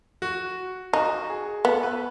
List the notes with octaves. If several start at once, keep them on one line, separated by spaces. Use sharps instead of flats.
F#4
D#4 F#4
G#4
B3 A4
B4